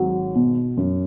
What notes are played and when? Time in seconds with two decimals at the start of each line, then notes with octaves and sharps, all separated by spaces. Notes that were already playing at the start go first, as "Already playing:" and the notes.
Already playing: G#1 F#3
0.35 B2
0.77 F#2